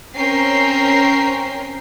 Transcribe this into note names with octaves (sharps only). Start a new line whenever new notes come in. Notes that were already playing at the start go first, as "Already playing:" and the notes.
C4 C#4 A#4 G5 A#5 C7